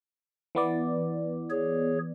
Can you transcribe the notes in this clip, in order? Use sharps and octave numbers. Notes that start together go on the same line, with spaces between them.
E3 B3 D5
G#4 C#5